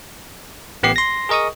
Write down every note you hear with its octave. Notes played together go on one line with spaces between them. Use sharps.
A1 B3 G4 C7
C6 A#6
G#4 A#4 D#5 C#6 D#6